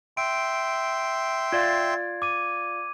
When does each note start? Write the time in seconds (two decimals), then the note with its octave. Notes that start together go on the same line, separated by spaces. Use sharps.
0.17 E5 G5 C6 D7
1.52 F4 D5 F5 G#6
2.22 D6 D#7